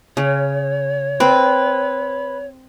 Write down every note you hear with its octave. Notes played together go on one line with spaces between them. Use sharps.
C#3 C#5
C4 B4